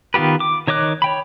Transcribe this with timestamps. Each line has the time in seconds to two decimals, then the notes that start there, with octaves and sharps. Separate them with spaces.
0.14 D#3 B3 F4 G4 B4
0.40 D6
0.67 D#3 C#5 D#5 D6 F#6
1.02 C#5 G5 B5